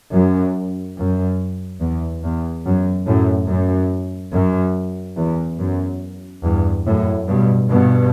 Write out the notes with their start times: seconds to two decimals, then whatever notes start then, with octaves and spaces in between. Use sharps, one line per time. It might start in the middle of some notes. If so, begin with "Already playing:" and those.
0.13 F#2
0.97 F#2
1.81 E2
2.23 E2
2.65 F#2
3.07 F#2 A2
3.49 F#2
4.34 F#2
5.18 E2
5.59 F#2
6.44 E2 G2
6.86 F#2 A2
7.28 G2 B2
7.70 G2 B2